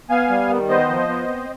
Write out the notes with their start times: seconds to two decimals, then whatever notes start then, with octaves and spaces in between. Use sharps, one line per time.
0.10 B3 F5 G#5
0.29 G3
0.49 D#3
0.69 B3 C5 D#5
0.89 F3
1.08 B3
1.28 C4